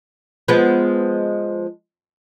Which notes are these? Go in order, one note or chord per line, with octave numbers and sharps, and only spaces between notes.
F3 G#3 B3